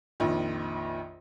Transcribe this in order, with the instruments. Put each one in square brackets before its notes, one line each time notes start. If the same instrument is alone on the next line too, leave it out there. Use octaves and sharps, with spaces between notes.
[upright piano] A#1 F2 D#3